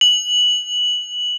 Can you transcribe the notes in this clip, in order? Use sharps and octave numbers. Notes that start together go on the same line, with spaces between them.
F#7